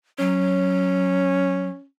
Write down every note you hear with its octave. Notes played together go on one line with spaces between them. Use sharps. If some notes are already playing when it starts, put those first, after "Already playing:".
F#3 C#4